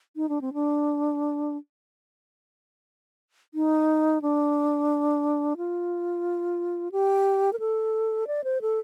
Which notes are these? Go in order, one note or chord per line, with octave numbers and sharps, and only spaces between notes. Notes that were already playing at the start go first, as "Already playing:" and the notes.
D#4
D4
C4
D4
D#4
D4
F4
G4
A#4
A4
D5
C5
A4